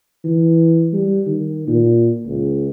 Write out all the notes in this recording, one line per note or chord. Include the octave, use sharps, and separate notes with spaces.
E3
G3
D#3
A#2
C#2